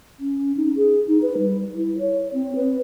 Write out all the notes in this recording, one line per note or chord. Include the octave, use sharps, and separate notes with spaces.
C#4
D#4
G#4
D#4
B4
G3
E4
C#5
C4
B4